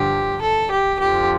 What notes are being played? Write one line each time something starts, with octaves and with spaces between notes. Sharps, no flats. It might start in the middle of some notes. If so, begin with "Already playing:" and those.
Already playing: G2 D3 F3 G4
A4
G4
F2 D3 F3 G4